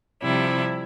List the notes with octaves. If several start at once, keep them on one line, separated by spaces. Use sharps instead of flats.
C3 F3 G3 E4